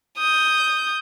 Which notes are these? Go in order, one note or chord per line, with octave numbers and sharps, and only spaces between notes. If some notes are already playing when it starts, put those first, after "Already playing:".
D#6 G6